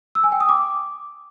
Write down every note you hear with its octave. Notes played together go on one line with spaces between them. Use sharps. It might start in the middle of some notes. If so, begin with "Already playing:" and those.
E6
G#5
G5
D#6
D6